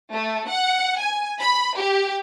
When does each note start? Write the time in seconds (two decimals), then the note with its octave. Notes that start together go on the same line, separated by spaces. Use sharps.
0.14 A3
0.49 F#5
0.99 G#5
1.41 B5
1.78 G4